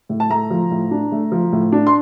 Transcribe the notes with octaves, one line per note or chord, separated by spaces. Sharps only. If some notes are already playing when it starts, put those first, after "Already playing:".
A2
A5
A3 A#5
F3
A2
D4
A3
F3
A2
D4
C6